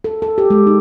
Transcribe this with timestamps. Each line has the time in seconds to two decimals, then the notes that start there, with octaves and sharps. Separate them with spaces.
0.04 A4
0.22 A4
0.38 G4
0.50 G#3
0.67 D#4